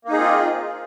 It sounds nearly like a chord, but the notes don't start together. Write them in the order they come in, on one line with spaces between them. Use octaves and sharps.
A#3 D#4 G#4 C4 F4